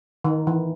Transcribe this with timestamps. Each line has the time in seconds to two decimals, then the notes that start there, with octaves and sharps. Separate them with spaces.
0.24 D#3
0.47 E3